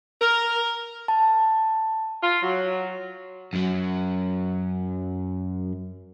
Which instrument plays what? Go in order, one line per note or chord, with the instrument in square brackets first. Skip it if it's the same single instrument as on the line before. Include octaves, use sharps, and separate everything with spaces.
[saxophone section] A#4
[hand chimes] A5
[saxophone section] F4
F#3
[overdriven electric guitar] F#2 F#3